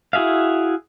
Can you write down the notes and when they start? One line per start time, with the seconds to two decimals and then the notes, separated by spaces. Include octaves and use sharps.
0.13 E4 F#4 G#4 E5 F5